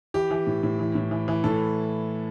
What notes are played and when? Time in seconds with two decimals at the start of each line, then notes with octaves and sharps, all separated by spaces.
0.14 E3 G4
0.31 E3
0.47 A2
0.63 A2
0.79 E3
0.95 A2
1.11 E3
1.28 E3
1.44 A2 A4